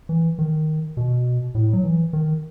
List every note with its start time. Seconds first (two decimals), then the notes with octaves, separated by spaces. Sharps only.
0.09 E3
0.38 D#3
0.97 B2
1.55 A2
1.73 F#3
1.84 E3
2.13 D#3